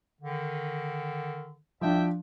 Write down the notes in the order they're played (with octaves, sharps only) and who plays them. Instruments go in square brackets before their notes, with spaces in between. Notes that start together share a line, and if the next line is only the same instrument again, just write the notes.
[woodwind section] D3 D#3
[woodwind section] C2 E5 G5 [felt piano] F3 D4